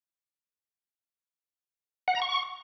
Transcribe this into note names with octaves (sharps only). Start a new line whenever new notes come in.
F#5
A#5
C#6